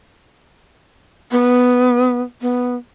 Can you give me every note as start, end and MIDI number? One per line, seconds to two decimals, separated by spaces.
1.31 2.22 59
2.42 2.75 59